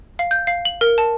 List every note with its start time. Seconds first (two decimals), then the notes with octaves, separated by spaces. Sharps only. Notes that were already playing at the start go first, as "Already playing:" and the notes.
0.19 F5
0.31 G6
0.47 F5
0.65 F#7
0.81 A#4
0.98 A5